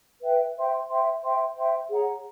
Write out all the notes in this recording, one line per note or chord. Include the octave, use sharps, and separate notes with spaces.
B4 E5 G5
C5 E5 G5 C6
C5 E5 G5 C6
C5 E5 G5 C6
C5 E5 G5 C6
G#4 C#5 F#5 A#5